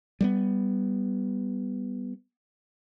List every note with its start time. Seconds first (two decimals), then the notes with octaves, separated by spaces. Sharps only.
0.21 G3 G#3 B3